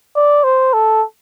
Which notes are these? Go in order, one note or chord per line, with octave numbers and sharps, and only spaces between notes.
D5
C5
A4